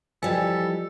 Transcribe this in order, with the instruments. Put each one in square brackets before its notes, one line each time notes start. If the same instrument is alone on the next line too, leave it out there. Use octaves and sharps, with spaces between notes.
[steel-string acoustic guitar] E3 G3 [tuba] F3 [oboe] A4 [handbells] D#5 G#5